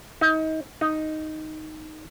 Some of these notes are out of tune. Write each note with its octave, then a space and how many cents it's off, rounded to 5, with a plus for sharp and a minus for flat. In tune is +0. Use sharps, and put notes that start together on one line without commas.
D#4 +30
D#4 +0